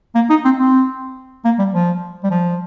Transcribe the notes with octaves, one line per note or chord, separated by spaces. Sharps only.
A#3
D#4
C4
C4
A#3
G3
F3
G3
F3